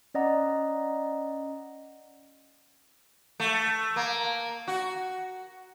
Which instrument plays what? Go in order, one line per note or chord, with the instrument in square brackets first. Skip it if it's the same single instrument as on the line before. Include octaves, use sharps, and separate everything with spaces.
[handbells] C#4 D5 D#5 F#5 A#5
[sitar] A3
A#3
F#4